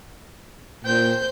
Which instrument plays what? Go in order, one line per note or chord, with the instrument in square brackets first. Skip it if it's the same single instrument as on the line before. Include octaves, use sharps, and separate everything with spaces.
[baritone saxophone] A#2 [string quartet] C5 G6 [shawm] G5